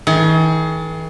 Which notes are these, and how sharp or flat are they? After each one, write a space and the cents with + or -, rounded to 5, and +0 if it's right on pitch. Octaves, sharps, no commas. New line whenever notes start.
E3 -45 G#4 +40